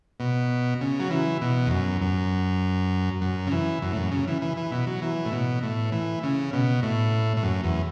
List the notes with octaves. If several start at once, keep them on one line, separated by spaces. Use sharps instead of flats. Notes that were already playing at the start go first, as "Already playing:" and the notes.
B2
C#3
F#3
E3
B2
E2
F#2
F#2
F#2
C#3
E3
F#2
A2
F#2
C#3
E3
E3
E3
B2
F#3
E3
A2
B2
A2
E3
C#3
B2
A2
A2
F#2
E2